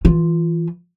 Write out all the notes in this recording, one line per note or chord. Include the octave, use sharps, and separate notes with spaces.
E3 F4